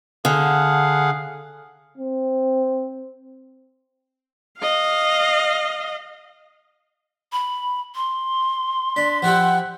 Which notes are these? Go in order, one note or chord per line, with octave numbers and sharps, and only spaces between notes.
D3 G#4 F5 F#5
C4
D#5 F5
B5
C6
D4 B6
F3 E4 G4 F#5